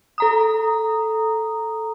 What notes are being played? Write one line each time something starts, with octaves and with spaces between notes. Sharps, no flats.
A4 A#5 D#6